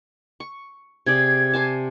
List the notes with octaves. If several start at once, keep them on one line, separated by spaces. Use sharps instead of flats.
C#6
C3 G#4 D5 G#6
C5 G#5 A5